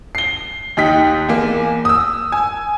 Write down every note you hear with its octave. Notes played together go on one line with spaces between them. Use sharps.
C7 G7
D#2 D#4 G5 B6
E2 A#3
D#6 E6
G#5